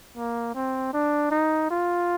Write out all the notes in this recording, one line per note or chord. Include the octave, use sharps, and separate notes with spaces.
A#3
C4
D4
D#4
F4